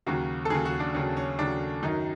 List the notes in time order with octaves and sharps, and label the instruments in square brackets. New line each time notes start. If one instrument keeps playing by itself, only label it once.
[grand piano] D#2 C#3 F#3 F#4
A4
D#2 C#3 F#3 G#4
F#4
D4
D#2 C#3 F#3 C#4
C#4
D#2 C#3 F#3 D4
F#2 D#3 F#3 D#4